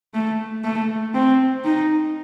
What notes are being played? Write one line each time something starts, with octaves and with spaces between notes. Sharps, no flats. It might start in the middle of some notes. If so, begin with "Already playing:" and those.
A3
A3
C4
D#4